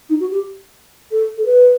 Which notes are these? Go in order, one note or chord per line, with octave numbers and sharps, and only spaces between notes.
D#4
F#4
G4
A4
A4
B4